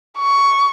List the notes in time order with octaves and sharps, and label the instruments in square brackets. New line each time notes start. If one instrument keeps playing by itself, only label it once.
[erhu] C#6